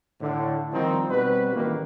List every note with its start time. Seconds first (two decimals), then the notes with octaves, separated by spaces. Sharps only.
0.21 A2 D3
0.72 D#3 F3 G3 C4 D#4
1.09 B2 G3 C4 F#4 B4
1.53 A1 D#3 A#3